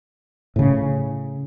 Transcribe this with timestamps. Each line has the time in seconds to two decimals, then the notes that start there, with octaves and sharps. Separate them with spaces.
0.56 A2 C#3